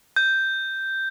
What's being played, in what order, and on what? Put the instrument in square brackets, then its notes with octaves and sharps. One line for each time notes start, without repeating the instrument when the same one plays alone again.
[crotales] G6